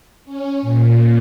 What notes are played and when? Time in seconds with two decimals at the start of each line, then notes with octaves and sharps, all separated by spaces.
0.25 C#4
0.61 A#2